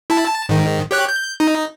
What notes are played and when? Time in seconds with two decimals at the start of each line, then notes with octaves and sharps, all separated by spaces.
0.10 E4 A5
0.27 A5
0.49 G#2 D#3
0.91 G4 C#5 F#6
1.09 G6
1.40 D#4